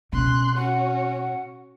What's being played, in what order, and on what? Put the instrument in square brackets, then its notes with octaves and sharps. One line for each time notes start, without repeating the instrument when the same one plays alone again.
[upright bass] B2 [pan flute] C#4 [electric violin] C6 F#6
[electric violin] C#4 F#4 [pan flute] F#5